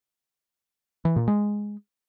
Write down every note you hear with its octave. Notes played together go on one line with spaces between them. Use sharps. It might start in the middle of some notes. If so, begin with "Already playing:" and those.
E3
A#2
G#3